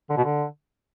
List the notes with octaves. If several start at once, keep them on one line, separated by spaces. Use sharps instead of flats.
D3
B2
D3